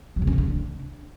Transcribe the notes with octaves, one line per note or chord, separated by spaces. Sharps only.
F#3
C#3
C#4
C#3
D4